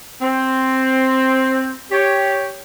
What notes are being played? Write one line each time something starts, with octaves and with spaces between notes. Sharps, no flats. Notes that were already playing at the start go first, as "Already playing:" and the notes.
C4
G4 C#5